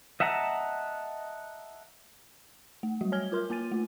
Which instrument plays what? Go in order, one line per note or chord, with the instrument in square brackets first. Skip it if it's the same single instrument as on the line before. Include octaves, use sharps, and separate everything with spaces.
[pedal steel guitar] D#5 E5 F#5 A5 A#5
[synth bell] A3
F#3 G3 F#4
C#5 G#5 F6 G#6 G7
F4 A#4 C6 F6
A#3 F4 G#5 A6 D#7
A3 F4